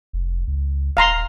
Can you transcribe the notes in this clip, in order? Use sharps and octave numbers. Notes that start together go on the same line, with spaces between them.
F1
C#2
D#1 F5 A#5 C6